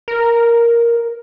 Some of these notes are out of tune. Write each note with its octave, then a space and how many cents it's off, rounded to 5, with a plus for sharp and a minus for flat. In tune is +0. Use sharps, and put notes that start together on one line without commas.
A#4 +5